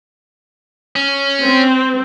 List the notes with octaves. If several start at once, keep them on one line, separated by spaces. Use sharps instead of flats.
C#4
C4